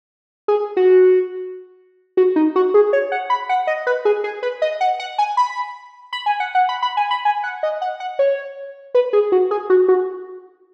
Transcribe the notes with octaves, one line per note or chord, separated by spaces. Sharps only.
G#4
F#4
F#4
D#4
F#4
G#4
C#5
F#5
B5
F#5
D#5
B4
G#4
G#4
B4
D#5
F#5
F#5
G#5
B5
B5
G#5
F#5
F#5
B5
B5
G#5
B5
G#5
F#5
D#5
F#5
F#5
C#5
B4
G#4
F#4
G#4
F#4
F#4